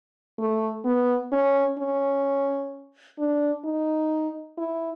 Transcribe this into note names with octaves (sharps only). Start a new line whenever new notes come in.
A3
B3
C#4
C#4
D4
D#4
E4